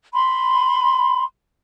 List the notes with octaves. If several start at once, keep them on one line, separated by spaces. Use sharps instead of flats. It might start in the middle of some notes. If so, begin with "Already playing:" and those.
B5 C6